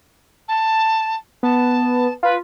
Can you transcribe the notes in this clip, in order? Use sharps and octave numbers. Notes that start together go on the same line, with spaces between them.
A5
B3 A5
F4 B4